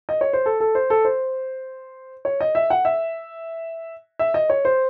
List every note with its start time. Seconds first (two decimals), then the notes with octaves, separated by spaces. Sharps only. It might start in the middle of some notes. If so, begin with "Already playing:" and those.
0.09 D#5
0.21 C#5
0.33 C5
0.46 A4
0.60 A4
0.75 C5
0.90 A4
1.05 C5
2.25 C#5
2.41 D#5
2.55 E5
2.70 F#5
2.85 E5
4.19 E5
4.34 D#5
4.50 C#5
4.65 C5